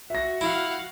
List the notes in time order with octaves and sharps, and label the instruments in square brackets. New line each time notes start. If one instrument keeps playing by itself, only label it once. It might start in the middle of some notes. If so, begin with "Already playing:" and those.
[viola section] F#4 [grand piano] E5 A#6
[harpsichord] E4 [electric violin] F5 F#5